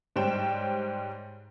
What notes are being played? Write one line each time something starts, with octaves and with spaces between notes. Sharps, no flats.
G#2 G3 C5 C#5 G5 E7